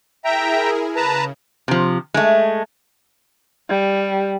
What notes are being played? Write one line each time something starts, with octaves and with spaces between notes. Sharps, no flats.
E4 G#4 A#4 E5 G5 A#5
C#3 B4 A5 A#5
C3 F3
G#3 A3
G3